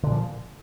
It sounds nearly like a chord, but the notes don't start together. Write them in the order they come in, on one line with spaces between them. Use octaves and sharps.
D3 A#2 F3